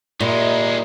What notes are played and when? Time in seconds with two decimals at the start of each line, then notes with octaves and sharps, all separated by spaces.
0.20 A#2 D#3 G#3 D#4 E4 G4